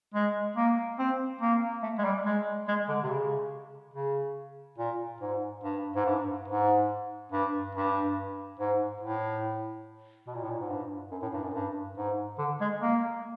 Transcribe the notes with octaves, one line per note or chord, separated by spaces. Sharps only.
G#3
A#3
C4
A#3
A3
G#3
G3
G#3
G#3
D3
C3
C#3
C#3
A#2
G#2
G2
G#2
G2
G#2
G2
G2
G#2
A2
B2
A#2
A2
A#2
G#2
G2
F#2
A2
G2
F#2
G2
G#2
D3
G#3
A#3